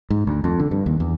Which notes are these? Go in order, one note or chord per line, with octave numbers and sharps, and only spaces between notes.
G#2
D2
F2
D3
G2
D#2
E2